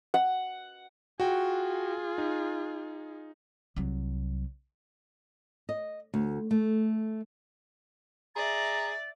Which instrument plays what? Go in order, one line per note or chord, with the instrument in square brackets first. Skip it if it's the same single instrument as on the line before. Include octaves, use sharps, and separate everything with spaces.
[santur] F#5
[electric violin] F4 G#4 [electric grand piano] F#4 G5
[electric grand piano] D#4
[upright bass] C2 F#3
[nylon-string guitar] D#5
D2
A3
[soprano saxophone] G#4 [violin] D5 E5 [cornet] A#5 [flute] A6